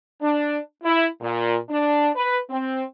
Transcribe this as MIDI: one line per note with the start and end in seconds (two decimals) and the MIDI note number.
0.21 0.59 62
0.84 1.07 64
1.21 1.56 46
1.69 2.09 62
2.15 2.39 71
2.50 2.82 60